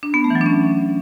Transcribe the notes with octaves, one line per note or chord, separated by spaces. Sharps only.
D4
B3
A3
E3
F#3
D4
C#4